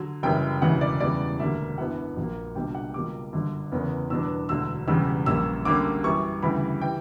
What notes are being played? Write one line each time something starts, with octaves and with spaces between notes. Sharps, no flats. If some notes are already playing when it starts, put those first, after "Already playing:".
Already playing: D3 F#3
F#1 F#2 C#3 E3 G3 G5
E1 D2 C#3 E3 F#5
D5
E2 C#3 E3 G3 B3 D5
E1 D2 D3 F#3 A#3 E5
F#2 E3 B3 D4 F#5
A#1 A#2 F#3 A#3
C#2 B2 G3 A#3 D4 G5
F#5
C#2 B2 G3 A#3 D6
G1 F#2 D3
F#1 E2 C#3 E3 B3
E2 B2 G3 B3 D4 E6
E1 D2 D3 F#3 E6
E1 E2 C#3 G3 C#4 E6
A#1 A#2 G3 A#3 C#4 E6
D2 D3 G3 A#3 C#4 D6
F#2 E3 G3 C#6
D2 C#3 E3 G3 B5
E3 G5